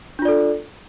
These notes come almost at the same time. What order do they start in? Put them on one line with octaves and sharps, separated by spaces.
D4 F4 D5 A4